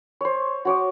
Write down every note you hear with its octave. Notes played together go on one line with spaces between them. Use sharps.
C5 C#5
F#4 C#5 D6